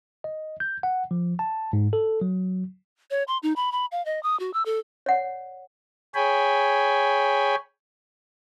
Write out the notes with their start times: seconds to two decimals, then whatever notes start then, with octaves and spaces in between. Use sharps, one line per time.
0.24 D#5
0.60 G6
0.83 F#5
1.11 F3
1.39 A5
1.73 G#2
1.93 A4
2.21 F#3
3.11 C#5
3.28 C6
3.43 D#4
3.56 B5
3.72 B5
3.92 F5
4.05 D#5
4.23 D#6
4.40 F#4
4.54 E6
4.66 A4
5.06 C#5 D5 F#5
6.15 G#4 C#5 G5 G#5 B5